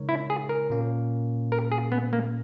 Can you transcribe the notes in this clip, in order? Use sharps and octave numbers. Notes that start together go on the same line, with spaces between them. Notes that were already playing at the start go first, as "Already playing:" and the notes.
Already playing: C#3 G#3 D#4 A#4 C#5
E4
G#4
A#4
A#2 A#3 C#4
A#4
G#4
B3
A#3